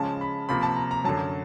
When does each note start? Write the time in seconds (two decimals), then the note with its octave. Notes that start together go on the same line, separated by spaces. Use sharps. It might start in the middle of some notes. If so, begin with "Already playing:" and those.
Already playing: C#3 F3 G#3 C#4 A5
0.21 B5
0.49 C3 F3 A#3 B5
0.63 A5
0.76 A#5
0.91 A#5
1.04 F#2 D3 F#3 A5